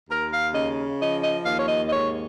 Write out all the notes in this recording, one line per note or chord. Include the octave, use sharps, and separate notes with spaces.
D#2 A#4
F5
C#3 D#5
F3 D#5
D#5
D#2 F5
C#5
D#5
D#5
G#2 C#5